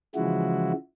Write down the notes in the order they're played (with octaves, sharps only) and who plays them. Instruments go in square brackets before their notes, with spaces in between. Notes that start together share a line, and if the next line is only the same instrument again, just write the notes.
[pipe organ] C#3 E3 F3 G#3 E4 F#4